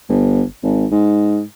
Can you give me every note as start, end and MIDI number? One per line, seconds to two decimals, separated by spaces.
0.09 0.43 31
0.63 0.86 32
0.91 1.41 44